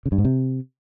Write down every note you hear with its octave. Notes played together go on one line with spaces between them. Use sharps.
C#3
G2
G#2
C3